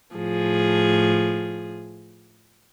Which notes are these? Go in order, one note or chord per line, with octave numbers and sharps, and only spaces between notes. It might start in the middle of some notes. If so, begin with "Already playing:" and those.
A2 F3 G#4